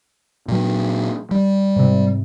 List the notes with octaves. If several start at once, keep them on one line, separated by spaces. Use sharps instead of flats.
A#2 F#3
G3
G#2 C3